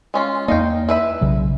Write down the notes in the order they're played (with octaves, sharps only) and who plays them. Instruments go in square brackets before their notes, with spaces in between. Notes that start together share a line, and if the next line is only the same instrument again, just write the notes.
[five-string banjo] G#3 C#4 F4
[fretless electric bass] E2 A#3 [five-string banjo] D#4 F5 G5
[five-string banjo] E4 B4 E5
[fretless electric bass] B1 C#3 F#3